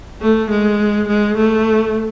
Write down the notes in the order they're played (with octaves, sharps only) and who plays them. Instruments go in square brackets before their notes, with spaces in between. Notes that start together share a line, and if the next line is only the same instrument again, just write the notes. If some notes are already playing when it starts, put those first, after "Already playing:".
[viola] A3
G#3
G#3
A3